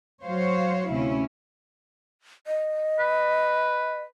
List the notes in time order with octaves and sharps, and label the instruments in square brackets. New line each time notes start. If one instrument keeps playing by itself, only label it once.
[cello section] F#3 F#4 C5 C#5 F5
D2 C3 C#4 E4
[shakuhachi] D#5
[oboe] B4